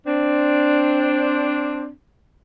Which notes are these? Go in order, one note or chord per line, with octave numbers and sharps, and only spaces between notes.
C4 D4